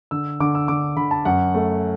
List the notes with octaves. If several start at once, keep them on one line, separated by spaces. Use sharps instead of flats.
D3 E6
D3 D6
E6
D3 D6
D3 B5
A5
F#2 F#5
A3